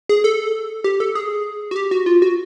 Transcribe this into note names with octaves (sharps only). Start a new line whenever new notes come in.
G#4
A4
G4
A4
G#4
F#4
G4
F#4
F4
F#4